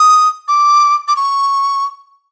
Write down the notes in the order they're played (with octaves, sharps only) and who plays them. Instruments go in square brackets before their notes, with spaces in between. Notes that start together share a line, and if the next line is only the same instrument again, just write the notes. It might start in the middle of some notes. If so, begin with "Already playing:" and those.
Already playing: [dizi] D#6
D6
D6
C#6